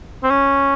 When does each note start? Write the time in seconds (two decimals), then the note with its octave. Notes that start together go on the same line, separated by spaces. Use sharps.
0.23 C4
0.30 C#4